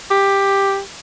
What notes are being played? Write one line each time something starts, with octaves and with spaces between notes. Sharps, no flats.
G4